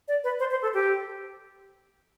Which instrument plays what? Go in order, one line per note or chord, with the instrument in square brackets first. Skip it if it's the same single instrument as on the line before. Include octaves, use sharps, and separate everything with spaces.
[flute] D5
B4
C5
C5
A4
G4